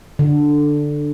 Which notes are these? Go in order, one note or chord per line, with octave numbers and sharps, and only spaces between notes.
D3